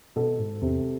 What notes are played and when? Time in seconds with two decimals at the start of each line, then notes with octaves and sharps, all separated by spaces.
0.16 B2 A4
0.39 G#2
0.62 E2 C3